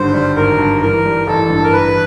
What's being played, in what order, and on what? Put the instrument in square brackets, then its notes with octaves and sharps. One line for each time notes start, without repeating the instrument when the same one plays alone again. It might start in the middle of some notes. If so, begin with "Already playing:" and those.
Already playing: [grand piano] G#1 G2 D3 G3 [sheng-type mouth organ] C5
[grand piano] G3
[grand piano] G#1 [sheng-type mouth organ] A#4
[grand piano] G2
[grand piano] E3 [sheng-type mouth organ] A#4
[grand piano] G3
[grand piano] A1 [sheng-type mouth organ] A4
[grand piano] G2
[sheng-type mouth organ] A#4
[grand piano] E3 [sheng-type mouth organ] B4